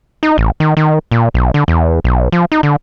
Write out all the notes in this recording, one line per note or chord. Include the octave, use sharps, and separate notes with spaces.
D#4
A1
D#3
D#3
A#2
B1
D3
E2
B1
F3
D#4
D3